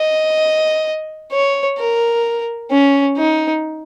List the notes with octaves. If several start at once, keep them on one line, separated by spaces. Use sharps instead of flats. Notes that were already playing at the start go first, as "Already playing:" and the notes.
Already playing: D#5
C#5
A#4
C#4
D#4